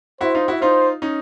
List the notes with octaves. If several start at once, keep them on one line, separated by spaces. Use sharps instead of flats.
E4 F#4 C5
D#4 F4
E4 F#4
D#4 F4 C5
C#4 D#4